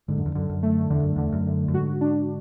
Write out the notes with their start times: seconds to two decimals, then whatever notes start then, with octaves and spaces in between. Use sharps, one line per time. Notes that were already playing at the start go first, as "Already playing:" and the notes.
0.08 G#2 D3
0.18 F#2
0.26 E2
0.35 F#2 D3
0.49 F#2
0.63 A3
0.90 E2 D3
1.03 F#2
1.16 E2 D3
1.32 F#2
1.47 D3
1.68 F#2
1.74 G#2 F#4
2.01 D4